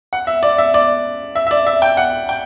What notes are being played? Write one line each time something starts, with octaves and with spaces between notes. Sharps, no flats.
F#5
E5
D5
E5
D5
E5
E5
D5
E5
G5
F#5
G5